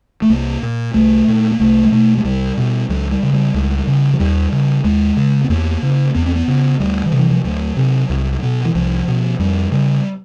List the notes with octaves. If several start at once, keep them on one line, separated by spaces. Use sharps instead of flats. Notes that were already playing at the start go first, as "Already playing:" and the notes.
A3
C2 A#3
A#2
C2 A3
A#2
A#3
C2 A3
G#3
B2 A3
G#3
C2 G3
B2
C#2 F#3
G3
C#3
G3
C#2
C#3
F#3
D#2 G3
C#3
D#2 G#3
C#3
B3
E2 A#3
C#3
E2 B3
C4
B3
C#3
D2 G3
D#3
C3
E3
F3
D2 F#3
C3
C2
B2
E3
C2 F3
B2
F2 G3
C#3 G3